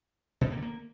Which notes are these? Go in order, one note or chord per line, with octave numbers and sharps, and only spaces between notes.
B2
D3
A#3
D3
A#3